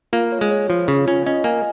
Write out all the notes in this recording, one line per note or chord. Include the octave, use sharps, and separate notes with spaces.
A#3 F4
C#5
G#3
C#5
F3 F4
C#3 C#5
C#4 F4
C#4 D#5
A#3 G#5